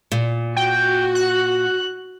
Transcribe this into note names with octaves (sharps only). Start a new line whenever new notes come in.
A#2
F#4 G5
F#6